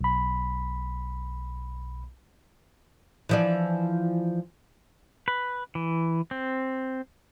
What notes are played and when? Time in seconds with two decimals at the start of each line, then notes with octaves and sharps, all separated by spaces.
0.01 B1 B5
3.29 E3 F3 D5
5.28 B4
5.75 E3
6.31 C4